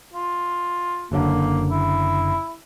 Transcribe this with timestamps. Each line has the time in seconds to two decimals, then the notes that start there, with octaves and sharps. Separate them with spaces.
0.14 F4
1.12 F#1 F#2 D3 A#3
1.70 E4